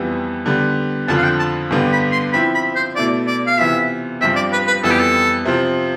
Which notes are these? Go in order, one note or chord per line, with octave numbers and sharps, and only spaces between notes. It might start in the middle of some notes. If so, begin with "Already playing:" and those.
Already playing: F2 E3 G3 B3
D3 G3 B3
F2 D3 F3 A5
F5
G5
A5
G2 D3 G3 B3
B5
C6
F3 C4 E4 B5
B5
C5
B2 A3 E4 D5
D5
F5
C3 E3 B3 F4 E5
G2 F3 C4 E5
D5
B4
B4
F2 E3 G3 B3 A4
G4
A4
C3 F3 C4